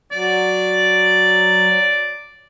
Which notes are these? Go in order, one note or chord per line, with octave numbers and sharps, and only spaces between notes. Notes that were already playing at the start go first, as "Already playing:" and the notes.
F#3 D5